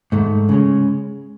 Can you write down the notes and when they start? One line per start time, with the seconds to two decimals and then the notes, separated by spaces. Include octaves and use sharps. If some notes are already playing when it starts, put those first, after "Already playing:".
0.12 G#2 D#3 A3
0.49 C#3 G#3 C#4